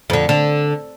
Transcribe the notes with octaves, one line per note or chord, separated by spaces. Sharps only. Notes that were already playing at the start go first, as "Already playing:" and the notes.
F2 D3
D3